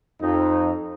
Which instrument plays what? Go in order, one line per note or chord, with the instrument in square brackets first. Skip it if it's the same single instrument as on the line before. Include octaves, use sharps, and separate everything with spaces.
[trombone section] F2 D#4